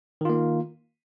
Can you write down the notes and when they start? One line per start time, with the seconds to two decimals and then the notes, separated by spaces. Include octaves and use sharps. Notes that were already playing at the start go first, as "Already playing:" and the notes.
0.21 D#3
0.25 F4
0.30 A#3